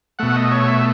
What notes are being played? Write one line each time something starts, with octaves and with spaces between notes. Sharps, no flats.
B2 A3 F#5
D#5
C#5
E5